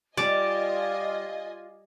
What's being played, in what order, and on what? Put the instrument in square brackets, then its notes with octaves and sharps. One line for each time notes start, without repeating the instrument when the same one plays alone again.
[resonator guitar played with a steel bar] G3 [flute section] F4 [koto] D5 [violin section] D#5 G#5